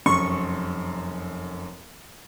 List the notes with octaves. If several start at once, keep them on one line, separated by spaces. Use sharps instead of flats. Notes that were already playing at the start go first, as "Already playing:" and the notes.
F1 F#2 C6 C#6